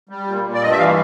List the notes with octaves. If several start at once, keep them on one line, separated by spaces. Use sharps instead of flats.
G3
A#2
A#2
D5
G2 D#5
E5
E3 F5